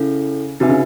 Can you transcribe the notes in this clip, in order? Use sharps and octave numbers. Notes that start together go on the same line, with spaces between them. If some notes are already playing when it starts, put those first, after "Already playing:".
Already playing: C#3 C#4 E4 A4
C3 D#4 F#4 B4 E5 G#5
C#3